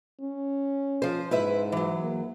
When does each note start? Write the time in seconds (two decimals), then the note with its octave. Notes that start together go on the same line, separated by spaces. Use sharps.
0.21 C#4
1.02 F3 C5
1.31 G#2 E4 B4 E5
1.72 E3 F#3
2.02 A#3